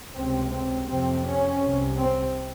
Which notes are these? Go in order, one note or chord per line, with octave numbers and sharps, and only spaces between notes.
C#2 C3 C4
C4
F2 C3 C4
C#4
C2 C3
C4